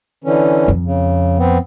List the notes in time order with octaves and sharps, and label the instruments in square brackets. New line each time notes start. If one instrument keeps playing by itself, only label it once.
[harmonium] D3 E3 C#4
[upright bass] F2
[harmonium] C#3
B3 C4